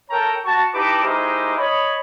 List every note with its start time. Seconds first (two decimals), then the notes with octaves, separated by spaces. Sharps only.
0.10 A4 A#4 C#5 G5 A5 A#5
0.45 F#4 A5 C#6
0.74 D#4 E4 G4 B4 A5 D6
1.03 G#3 D#4 E4 G4 A#4 C5
1.58 C#5 D#5 B5